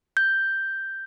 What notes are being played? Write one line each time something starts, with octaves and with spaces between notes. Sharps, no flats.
G6